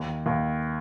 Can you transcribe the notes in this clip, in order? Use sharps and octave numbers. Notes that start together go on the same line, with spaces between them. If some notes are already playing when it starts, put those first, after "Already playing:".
Already playing: D#2
D#2